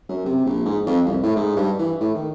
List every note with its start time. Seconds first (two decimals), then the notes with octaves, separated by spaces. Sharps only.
0.09 F#2
0.25 C3
0.45 A#1
0.65 G#2
0.86 F2
1.06 C2
1.23 A2
1.36 G#2
1.56 G2
1.79 E3
2.00 A2
2.15 D#3